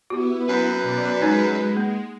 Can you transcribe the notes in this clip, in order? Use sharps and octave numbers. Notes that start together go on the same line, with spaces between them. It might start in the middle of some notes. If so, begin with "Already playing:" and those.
B3 E4 F#4 G4
F#2 B4
B2 D5
G#3 D#4 C#5 G#5
A#3